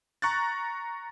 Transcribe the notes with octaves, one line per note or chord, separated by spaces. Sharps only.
A#5 C#6 F#6 A6